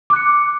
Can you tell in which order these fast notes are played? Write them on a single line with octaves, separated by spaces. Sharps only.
D6 F#6 C#7